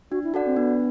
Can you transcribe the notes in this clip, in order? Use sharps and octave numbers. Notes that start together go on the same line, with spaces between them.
D4 F#4
E4
D4 F#4 A4 D5 F#5
C4
B3 D4